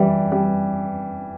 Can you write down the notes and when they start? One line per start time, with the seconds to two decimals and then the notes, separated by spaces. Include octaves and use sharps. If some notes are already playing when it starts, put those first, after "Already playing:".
Already playing: E3 G3
0.32 G3